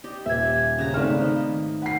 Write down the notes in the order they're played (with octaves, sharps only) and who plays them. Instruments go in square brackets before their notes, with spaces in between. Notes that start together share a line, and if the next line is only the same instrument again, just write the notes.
[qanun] G4 D5 D#5
[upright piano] D#1 [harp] E5 G#6
[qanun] C#3 B4 A#5
[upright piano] G#1 D5 F6 [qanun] A3 A#3 B4
[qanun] D#3 D#5
[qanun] B4 B5 [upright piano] F#5 C7